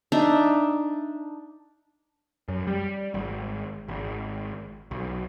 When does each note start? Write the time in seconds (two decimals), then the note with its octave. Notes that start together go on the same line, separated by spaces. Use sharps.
0.12 D4 D#4 E5
2.48 F#2
2.67 G3
3.14 G#1
3.88 G#1
4.91 B1